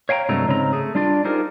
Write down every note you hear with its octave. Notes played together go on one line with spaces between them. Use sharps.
C#5 F5 G5 G#5 A#5
G2 C3 F#3 G#3 A3 A#5
G#2 C#3 C4 A#5
A3 G#4
G3 D4 F4 D5
D#4 F4 G4 G#4 A#4 C5